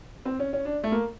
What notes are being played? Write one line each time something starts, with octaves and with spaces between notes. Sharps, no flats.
C4
C#4
C#4
D4
A3
A#3